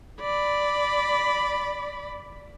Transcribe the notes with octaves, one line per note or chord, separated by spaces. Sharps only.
D5 B5